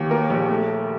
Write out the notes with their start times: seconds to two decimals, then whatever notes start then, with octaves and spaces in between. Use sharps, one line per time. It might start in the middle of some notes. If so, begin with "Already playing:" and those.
Already playing: D#2
0.11 A#3 A#4
0.30 A#1
0.49 A3